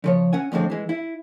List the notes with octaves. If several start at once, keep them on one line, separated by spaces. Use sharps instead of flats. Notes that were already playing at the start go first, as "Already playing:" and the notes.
C#3 F3 C#5
C#4 F#5 G#5
F2 A2 D3 G#3 C4
E3 G#3
E4